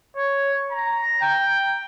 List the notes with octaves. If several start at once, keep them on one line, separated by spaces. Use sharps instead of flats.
C#5
A#5
G5